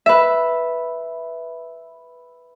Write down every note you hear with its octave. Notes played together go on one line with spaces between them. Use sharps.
B4 E5